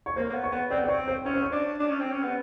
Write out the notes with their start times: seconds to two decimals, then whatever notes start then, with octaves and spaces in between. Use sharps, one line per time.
0.06 C#5
0.16 A#3 C5
0.30 A#3
0.34 B3
0.43 C#5
0.52 B3
0.70 C4 D5
0.79 B3
0.84 D5
0.88 C4 C#5
1.08 C5
1.25 C#4 C#5
1.34 C5
1.42 C#5
1.52 D4
1.80 D4
1.90 C#4
2.01 C4
2.11 C#4
2.23 B3